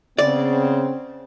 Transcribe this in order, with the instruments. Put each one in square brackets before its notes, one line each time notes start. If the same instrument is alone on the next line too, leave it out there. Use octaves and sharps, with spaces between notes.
[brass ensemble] C#3 B3 C4 [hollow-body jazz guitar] D5